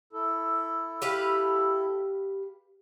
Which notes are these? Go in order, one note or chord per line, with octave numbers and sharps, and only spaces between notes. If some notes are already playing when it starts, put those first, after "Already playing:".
E4 A4
G4 B4 F5